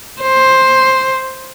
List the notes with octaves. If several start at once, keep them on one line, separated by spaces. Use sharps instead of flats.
C5